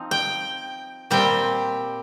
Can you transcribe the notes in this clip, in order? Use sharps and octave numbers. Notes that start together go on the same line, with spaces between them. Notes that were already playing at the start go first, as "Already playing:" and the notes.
Already playing: F3 C4 D#4
G5
A#2 G3 C4 G5